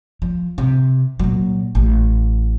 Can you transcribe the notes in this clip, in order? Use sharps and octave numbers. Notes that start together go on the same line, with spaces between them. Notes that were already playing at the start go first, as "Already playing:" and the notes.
F3
C3
A#2 F#3
A1